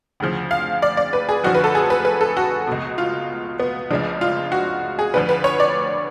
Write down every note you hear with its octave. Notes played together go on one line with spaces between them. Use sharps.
D2 C#3 F3
F5
D5
D5
B4
G#4
F#2 D3 F3 F#4
B4
A4
G#4
B4
B4
A4
F#4
C#2 B2
F4
B3
C#2 C#3 F3 D4
F4
F#4
G#4
D2 D3 F3 B4
B4
C#5
D5